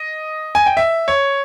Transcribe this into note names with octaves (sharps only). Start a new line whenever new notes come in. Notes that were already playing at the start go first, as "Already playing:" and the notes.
Already playing: D#5
G#5
G5
E5
C#5